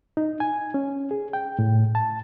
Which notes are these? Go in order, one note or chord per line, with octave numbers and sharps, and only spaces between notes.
D#4
G#5
C#4
G#4
G5
A2
A5